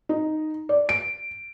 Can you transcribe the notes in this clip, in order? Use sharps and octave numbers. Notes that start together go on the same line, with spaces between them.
D#4
D5
D7